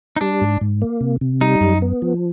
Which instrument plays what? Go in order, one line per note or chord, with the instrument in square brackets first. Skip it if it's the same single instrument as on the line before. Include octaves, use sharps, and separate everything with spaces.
[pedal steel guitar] D#4
[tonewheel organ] G3 [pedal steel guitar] D4
[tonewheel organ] G#2
G#2
A#3
C3
C3
[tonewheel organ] G3 [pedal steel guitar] D#4
[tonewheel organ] F#2
B3
F3